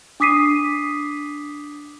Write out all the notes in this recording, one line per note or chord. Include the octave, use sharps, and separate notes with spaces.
D4 D6 D#6 B6 C7 D#7